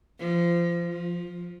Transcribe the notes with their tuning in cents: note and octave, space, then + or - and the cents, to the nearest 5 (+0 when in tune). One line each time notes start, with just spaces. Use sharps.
F3 -25
F3 +10